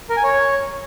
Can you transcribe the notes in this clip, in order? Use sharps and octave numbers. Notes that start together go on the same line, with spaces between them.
A#4
G#5
C#5